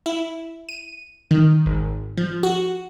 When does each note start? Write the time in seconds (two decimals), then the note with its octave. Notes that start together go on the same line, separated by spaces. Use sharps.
0.06 E4
0.69 D#7
1.31 D#3
1.66 G#1
2.17 F3
2.43 F#4